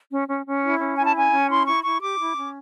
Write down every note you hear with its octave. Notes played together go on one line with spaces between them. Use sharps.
C#4
C#4
C#4
E4
C#4
E4 G#5
A5
C#4 G#5
C#4
E4 C6
E4 C#6
E4 C#6
G4 D6
E4
C#4